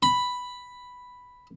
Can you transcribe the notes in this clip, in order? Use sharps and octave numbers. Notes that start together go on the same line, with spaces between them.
B5